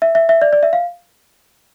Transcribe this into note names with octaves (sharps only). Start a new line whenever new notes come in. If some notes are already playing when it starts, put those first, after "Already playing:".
E5
E5
E5
D5
D5
E5
F5